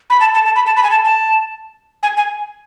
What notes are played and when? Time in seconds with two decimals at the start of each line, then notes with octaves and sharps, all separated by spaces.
0.10 B5
0.20 A5
0.34 A5
0.45 A5
0.56 B5
0.66 A5
0.76 B5
0.83 G#5
0.91 A5
1.05 A5
2.03 G#5
2.17 G#5